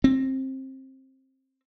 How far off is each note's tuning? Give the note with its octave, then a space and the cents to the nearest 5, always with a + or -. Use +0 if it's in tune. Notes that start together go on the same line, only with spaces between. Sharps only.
C4 +20